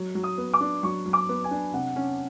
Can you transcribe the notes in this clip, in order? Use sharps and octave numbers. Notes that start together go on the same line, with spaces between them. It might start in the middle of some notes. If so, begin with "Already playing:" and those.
Already playing: F#3
F#3
D#6
B3
D6
D4
F#3 C#6
F#3
D6
B3
G#5
D4
C3 F#5
C#4